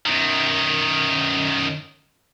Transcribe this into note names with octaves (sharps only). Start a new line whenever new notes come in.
F#2 D#3